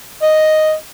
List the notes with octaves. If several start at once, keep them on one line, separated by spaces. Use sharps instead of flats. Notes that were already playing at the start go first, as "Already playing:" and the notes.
D#5